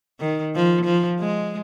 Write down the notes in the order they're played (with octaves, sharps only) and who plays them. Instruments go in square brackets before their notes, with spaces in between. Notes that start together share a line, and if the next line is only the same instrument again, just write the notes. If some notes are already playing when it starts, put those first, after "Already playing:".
[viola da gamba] D#3
F3
F3
G#3